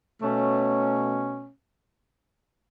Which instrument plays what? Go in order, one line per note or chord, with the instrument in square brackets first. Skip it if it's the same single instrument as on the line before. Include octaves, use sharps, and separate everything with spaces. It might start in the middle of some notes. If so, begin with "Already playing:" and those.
[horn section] B2 A3 C#4